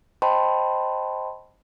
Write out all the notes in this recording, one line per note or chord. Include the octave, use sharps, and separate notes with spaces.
C5 D#5 G5 A5 B5 C6